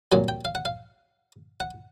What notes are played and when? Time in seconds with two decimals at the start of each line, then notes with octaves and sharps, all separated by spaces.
0.12 C2 A#2 F#3 G#5
0.28 G5
0.45 F5
0.55 F#5
0.65 F5
1.60 F#5